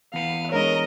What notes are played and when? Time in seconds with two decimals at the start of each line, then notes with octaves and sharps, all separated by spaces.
0.14 E2 B3 F5
0.51 G#3 D4 A#4 C#5 D#5